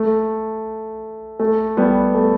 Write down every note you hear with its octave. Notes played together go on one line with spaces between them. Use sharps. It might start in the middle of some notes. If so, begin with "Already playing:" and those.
Already playing: A3
A3
G3 B3
A3